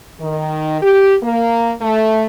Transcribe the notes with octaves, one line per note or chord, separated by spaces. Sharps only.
D#3
G4
A#3
A3